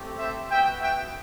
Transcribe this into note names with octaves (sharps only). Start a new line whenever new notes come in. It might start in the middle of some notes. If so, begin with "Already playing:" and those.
Already playing: A3 C4 G4
C5 E5
B3 F#4 E5 G5
E5 G5